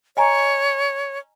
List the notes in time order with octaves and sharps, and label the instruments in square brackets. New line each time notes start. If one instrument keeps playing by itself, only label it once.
[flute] C#5 [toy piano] D#5 G#5 A#5